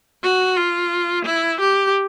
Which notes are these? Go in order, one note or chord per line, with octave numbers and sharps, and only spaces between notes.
F#4
F4
E4
G4